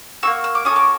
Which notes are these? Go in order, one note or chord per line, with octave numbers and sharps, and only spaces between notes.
A#3 D#4 F#4 E6
E6
D6
C#4 F#4 A4 D#6
D6